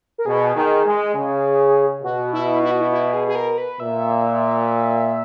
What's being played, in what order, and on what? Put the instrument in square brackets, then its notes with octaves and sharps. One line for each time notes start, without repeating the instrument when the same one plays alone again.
[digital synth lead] A#4
[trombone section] B2 [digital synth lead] G#4
[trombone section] D#3
G#3
C#3
[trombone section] B2 [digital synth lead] F#4
[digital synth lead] E4
E4
F#4
E4
E4
G#4
G#4
A#4
B4
[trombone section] A#2 [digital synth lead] E5